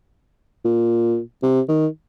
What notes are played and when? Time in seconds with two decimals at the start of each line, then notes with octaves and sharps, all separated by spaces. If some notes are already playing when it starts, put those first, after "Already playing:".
0.65 A#2
1.43 C3
1.69 D#3